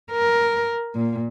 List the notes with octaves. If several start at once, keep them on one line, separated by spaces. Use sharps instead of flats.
A#4
A#2